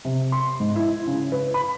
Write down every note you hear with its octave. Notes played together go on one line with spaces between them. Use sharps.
C3
C6
G#2
E4
C#3
B4
B5